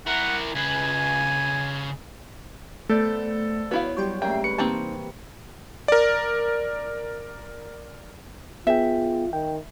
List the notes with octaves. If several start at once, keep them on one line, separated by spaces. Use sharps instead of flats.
E4 A#4 F#5
C#3 B4 G#5
A3 B3 A4 C5 D5
B3 E4 F#4 C#5 F5
F#3 G3 G4 G5 C6 C#6
D2 G#2 A#3 C#4 E5 G5 C7
B4 C#6 C#7
C3 E3 A#3 C4 D#4 A5
A#4 D5
B3 F4 G#4 E5 G5
D#3 G5